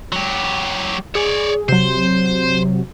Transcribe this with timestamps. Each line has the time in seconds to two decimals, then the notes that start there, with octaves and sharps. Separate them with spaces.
0.13 F#3 G4
1.15 G#4 C#5 D5
1.69 C3 F#3 C5